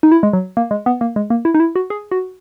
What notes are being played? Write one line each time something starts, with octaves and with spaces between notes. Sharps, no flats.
D#4
E4
G#3
F#3
A#3
G#3
B3
A#3
G#3
A#3
E4
D#4
E4
F#4
G#4
F#4